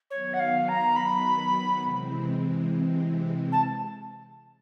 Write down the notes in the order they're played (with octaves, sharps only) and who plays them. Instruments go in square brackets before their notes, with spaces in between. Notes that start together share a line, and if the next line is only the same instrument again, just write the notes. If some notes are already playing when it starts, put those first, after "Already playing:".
[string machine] D#3 F#3 B3 [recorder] C#5
[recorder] F#5
F5
A#5
B5
[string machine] C3 E3 G#3 C4
[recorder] A5